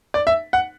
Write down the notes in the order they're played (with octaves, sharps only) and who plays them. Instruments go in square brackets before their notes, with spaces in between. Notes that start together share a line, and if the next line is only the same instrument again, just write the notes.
[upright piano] D5
E5
F#5